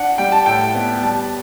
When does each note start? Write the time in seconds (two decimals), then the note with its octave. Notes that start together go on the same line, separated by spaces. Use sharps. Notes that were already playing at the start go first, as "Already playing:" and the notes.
Already playing: D4 F#5
0.18 G3 G5
0.32 A5
0.46 A2 G5
0.75 B3
1.03 G3 A5